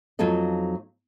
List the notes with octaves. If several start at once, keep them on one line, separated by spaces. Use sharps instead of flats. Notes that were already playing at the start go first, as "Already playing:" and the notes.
F2 F#3 D#4 F4 A4 D#5